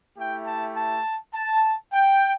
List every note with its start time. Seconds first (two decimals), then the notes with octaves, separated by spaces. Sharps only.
0.18 A3 E4 G4 G5
0.47 A5
0.77 A5
1.34 A5
1.93 G5